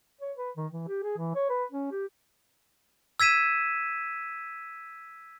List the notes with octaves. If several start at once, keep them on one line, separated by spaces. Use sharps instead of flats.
C#5
B4
D#3
E3
G4
G#4
E3
C#5
B4
C#4
G4
E6 G#6 B6 D#7 E7